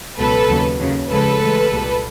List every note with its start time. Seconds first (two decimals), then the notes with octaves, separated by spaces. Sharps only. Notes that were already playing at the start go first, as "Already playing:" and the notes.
0.18 C#2 B2 F#3 A4 B4
0.49 D#2 C#3 F#3
0.79 D#2 C#3 F#3
1.09 C#2 C#3 F3 G#3 A4 B4
1.40 A2 E3 G#3
1.70 C2 A#2 G3